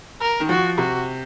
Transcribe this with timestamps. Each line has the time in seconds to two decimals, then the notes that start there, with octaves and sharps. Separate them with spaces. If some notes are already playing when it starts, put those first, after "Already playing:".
0.21 A#4
0.40 D#3
0.49 F3 F#4
0.78 C3 F#4